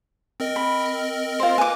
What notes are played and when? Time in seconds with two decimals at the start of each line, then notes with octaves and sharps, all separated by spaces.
0.40 C4 A#4 D#5
0.56 B5
1.40 F4 C5
1.58 B4 G#5 D6